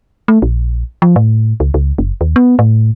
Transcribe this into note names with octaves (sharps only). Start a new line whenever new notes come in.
A3
A#1
F3
A2
C#2
C#2
F#1
D#2
B3
A2